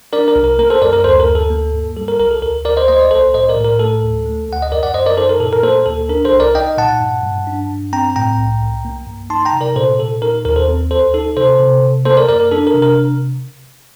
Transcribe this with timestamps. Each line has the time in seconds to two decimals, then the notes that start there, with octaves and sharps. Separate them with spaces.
0.13 D4 A#4 D5
0.28 A#4
0.36 C2
0.44 A#4
0.59 A#3 A#4
0.70 A4 C5
0.82 F#2 A#4 D5
0.93 A#4
1.04 D2 A4 C5
1.20 A#4
1.28 D2
1.35 A4
1.50 A#3
1.73 G2
1.97 G3 A4
2.08 A#4
2.19 C2 A#4
2.31 A4
2.42 D2 A#4
2.65 D2 A#4 D5
2.77 C5 D#5
2.88 A#3 C5 D#5
3.01 D5
3.11 C2 A4 C5
3.34 A2 C5 D#5
3.49 A#4 D5
3.57 A2
3.64 A#4
3.79 A3 A4
4.03 D2
4.26 A3
4.49 D2 F#5
4.62 D#5
4.72 F#2 A#4 D5
4.83 D5 F#5
4.94 F#2 C5 D#5
5.06 A#4 D5
5.17 D#4 A4 C5
5.29 A#4
5.40 A#2 A4
5.53 A#4
5.63 A#3 A4 C5
5.86 D2 A4
6.09 D4 A#4
6.25 A4 C5
6.33 C2
6.40 A#4 D5
6.55 D#4 D#5 G5
6.78 A#2 F#5 A5
7.01 G2
7.23 G2
7.47 D4
7.70 G2
7.93 C4 G5 A#5
8.16 A2 G5 A#5
8.38 C2
8.61 C2
8.85 A#3
9.07 G2
9.30 D#4 A5 C6
9.45 G5 A#5
9.53 C3
9.61 A#4 D5
9.76 A#2 A4 C5
9.99 A#2 A4
10.22 D#4 A#4
10.45 D#2 A#4
10.56 A4 C5
10.68 C4
10.91 D2 A4 C5
11.14 D#4 A4
11.37 C3 A4 C5
11.60 C3
11.82 C3
12.05 A#3 A4 C5
12.17 A#4 D5
12.29 F#2 A#4 D5
12.40 A#4
12.51 D4 A4
12.67 A#4
12.74 C3
12.82 A#4